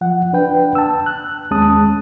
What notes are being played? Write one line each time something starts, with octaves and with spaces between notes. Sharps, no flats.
F3 F#5
D4 B4 G5
A5 E6
F#6
D#2 G#3 C#4 A5 D#6